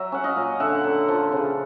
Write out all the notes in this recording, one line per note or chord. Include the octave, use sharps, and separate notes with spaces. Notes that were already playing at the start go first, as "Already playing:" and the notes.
Already playing: F#3 E5
C#4 F#5
D#5 F5
A#2
D3 E5 F#5
D3
F3
C#3